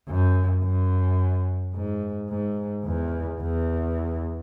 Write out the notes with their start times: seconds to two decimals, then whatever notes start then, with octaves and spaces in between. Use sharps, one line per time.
0.08 F#2
0.63 F#2
1.75 G#2
2.29 G#2
2.85 E2
3.41 E2